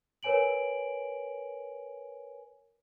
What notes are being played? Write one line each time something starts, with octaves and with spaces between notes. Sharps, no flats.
A#4 B4 C#5 G#5 D7 F#7